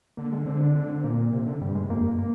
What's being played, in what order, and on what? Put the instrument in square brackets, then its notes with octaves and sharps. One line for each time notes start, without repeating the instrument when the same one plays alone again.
[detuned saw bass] D3 [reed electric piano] A#3
[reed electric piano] G#3
[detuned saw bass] D3 [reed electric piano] C4
[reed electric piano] D4
[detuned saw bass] D3 [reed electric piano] D4
[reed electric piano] C4
[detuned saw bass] A#2 [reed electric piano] A#3
[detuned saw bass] C3
D3
[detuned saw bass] G2 [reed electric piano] G3
[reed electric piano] G#3
[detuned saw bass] F2 [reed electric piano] A#3
[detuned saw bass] G2
[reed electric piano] A#3